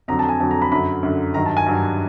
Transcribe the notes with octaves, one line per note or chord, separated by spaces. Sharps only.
F2 D3 F#3 A#5
A5
G#5
F2 D3 F#3 A5
A#5
B5
F#2 D3 F#3 B5
F#2 D3 F#3
G2 D#3 F#3 A#5
A5
G#5
G2 D#3 F#3